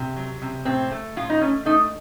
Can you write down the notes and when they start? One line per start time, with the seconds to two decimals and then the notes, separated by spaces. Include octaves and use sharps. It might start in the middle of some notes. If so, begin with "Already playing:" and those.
Already playing: C3
0.16 F#3
0.42 C3
0.65 A2 C4
0.91 A3
1.16 A2 F4
1.30 D#4
1.41 A3 C#4
1.65 A3 D#4